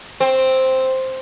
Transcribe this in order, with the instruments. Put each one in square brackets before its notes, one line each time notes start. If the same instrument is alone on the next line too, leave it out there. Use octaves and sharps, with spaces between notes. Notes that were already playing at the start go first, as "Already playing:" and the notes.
[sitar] C4